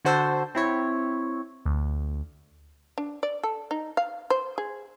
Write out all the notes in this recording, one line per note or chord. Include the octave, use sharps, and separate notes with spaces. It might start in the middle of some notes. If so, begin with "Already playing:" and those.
D3 F#4 C5 A5 E6
C4 E4 C#5
D2
D4
D5
A4
D#4
F5
C5
G#4